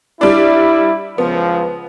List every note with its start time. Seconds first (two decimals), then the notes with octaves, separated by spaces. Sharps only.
0.21 G3 D4 E4
1.18 C#2 F3 B3